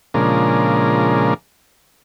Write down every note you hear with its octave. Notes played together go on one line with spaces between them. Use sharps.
A#2 C#3 F3 G#3 D4 A#4